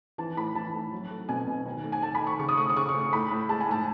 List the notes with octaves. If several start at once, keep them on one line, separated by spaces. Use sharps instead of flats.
E3 A5
A2 B5
E3 A5
A2
F#3
A3
B2 G#5
B2
D#3
A3
G#5
A3 A5
B5
D#3
C#6
C#3 C#6
D#6
A3 C#6
D#6
C#3 C#6
C#6
A3
A2 B5
A2
G#3 A5
G#5
A2 A5